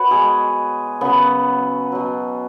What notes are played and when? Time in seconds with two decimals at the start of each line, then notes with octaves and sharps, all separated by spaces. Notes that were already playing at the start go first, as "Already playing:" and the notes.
Already playing: F#4 B4 C#5
0.11 B2 G#3 G#4
1.01 C#3 F#3 B3
1.92 B2 F#3